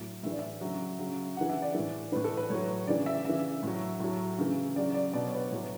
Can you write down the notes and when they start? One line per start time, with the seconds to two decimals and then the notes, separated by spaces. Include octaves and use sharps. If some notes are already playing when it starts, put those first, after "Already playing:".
Already playing: A2 F#3
0.23 A2 E5
0.26 E3 D5
0.39 E5
0.61 C#3 F#3
0.99 C#3 F#3
1.37 C#3 E3 F#5
1.49 E5
1.62 D5
1.75 A2 E3
2.12 A2 E3 B4
2.24 A4
2.37 B4
2.50 A2 F#3 C#5
2.87 C#3 E3 D5
3.06 E5
3.25 C#3 E3 E5
3.63 A2 F#3
4.00 A2 F#3
4.38 C#3 E3
4.76 C#3 F#3 D5
4.94 D5
5.13 B2 F#3 D5
5.25 C#5
5.35 B4
5.45 C#5
5.51 A2 F#3